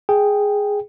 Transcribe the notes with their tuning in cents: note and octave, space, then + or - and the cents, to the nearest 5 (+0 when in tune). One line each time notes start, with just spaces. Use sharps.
G#4 +0 G5 +0